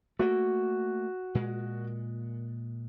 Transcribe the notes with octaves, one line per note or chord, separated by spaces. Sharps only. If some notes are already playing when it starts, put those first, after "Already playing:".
A3 A#3 F#4
A#2 G#3